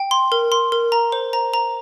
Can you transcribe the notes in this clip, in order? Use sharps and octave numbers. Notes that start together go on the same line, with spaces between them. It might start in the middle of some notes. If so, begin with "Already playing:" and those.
Already playing: G5
C6
A#4
C6
A#4
A#5
C5
A#5
A#5